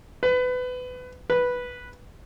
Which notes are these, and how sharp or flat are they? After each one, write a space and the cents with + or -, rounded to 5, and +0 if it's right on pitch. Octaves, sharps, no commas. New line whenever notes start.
B4 +25
B4 -5